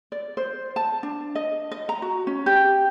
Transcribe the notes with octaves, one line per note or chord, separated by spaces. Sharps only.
D5
C5
A5
D4
D#5
D#5
A#5
F#4
C#4
G4